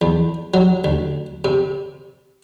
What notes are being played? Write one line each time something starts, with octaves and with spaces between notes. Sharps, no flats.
E2
F#3
D2
C3